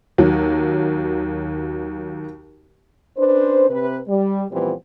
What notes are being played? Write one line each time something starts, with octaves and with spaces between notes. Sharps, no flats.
D#2 F#3
C#4 D4 B4 C5
C3 B4
G3
A#2 E3 F3 G3 B3 C4